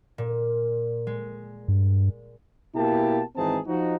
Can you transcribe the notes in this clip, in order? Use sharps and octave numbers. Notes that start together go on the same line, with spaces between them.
A#2
G#3
G2
B2 A#3 E4 G4 A5
G#1 E3 C4 D#4 G#4 A5
F3 D#4 F#4